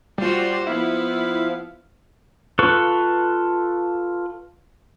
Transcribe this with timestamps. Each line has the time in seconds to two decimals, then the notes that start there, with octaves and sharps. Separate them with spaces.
0.18 G3 F4 F#4 C5
0.67 F3 B3 E4 F5
2.59 F4 A4 B4 C#6